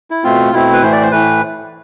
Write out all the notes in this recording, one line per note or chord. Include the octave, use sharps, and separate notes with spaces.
E4
B2 A3 C4 F4
B2 A3 C4 E4
B4
A2 E3 A3 C5
D5
C5
A2 E3 A3 B4